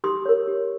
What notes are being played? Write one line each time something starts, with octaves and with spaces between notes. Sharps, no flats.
G4 C6 D#6
A#4 C#5
G4